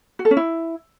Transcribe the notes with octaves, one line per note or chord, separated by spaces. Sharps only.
F#4
A4
C#4
E4